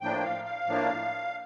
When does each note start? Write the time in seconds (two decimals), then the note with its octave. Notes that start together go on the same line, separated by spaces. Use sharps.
0.01 A2 F3 A#3 D4 G5
0.24 F5
0.45 F5
0.66 A2 F3 A#3 D4